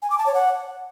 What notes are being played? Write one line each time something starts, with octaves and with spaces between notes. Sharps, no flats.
G#5
D6
A5
C#5
F#5